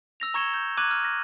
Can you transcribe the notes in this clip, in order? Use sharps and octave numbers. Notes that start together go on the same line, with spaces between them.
E6 A#6 F7
A#5 C#6 G#6 C#7 E7 G7
G6
A#5 D6 F#6 G#6 D#7 F#7
F6
A#6